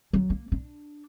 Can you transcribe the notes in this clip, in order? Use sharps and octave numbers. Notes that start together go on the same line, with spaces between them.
F#3
A#3
D4